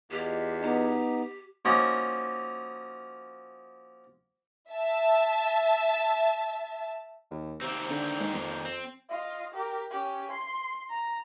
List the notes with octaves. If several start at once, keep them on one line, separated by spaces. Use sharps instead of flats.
E2 F4 G4 D#5
B3 D#4 G4
F3 A#3 C#4 D#4 F#4
E5 A5
D#2
C3 D#3 A#3 C4
D3
G#2
F2
C4
F4 D#5
G4 A#4
C#4 G4
C6
A#5